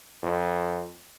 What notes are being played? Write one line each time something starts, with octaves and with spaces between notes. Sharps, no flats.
F2